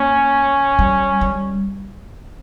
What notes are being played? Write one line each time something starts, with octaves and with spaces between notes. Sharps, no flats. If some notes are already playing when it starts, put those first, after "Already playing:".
Already playing: A#3 C#4
G3
G3